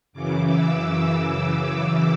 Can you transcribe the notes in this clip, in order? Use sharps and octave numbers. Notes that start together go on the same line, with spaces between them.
F#2 C#3 E3 D6
E6
E6
D6